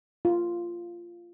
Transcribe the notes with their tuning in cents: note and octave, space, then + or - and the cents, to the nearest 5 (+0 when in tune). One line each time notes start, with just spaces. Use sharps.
F4 -10